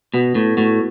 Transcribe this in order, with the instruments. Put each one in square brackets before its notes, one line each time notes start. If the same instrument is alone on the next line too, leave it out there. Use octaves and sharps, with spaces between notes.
[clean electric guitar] B2 [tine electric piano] B3
[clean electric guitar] A2
[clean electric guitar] A2 [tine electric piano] F#4